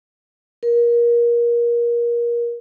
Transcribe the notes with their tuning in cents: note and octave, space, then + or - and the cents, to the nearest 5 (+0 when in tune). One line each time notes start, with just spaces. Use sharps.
A#4 +25